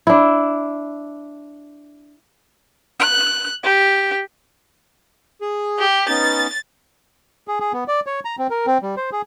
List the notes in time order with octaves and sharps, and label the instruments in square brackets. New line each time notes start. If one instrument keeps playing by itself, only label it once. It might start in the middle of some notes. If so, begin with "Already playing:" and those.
[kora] D4 E4
[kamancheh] F#6
G4
[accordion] G#4
[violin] G4
[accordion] B3 C#4 D#4 [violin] A6
[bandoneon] G#4
G#4
B3
D5
C#5
A#5
C4
A#4
C4
G3
C5
G#4